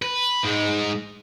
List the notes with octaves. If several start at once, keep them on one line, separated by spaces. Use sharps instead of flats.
B4
G#2 G#3